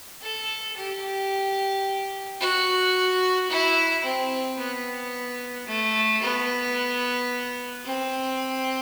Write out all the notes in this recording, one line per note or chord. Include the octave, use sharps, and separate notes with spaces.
A4
G4
F#4
E4
C4
B3
A3
B3
C4